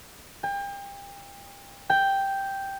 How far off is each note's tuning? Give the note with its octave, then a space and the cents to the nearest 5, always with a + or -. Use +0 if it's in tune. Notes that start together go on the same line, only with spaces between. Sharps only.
G5 +35
G5 +0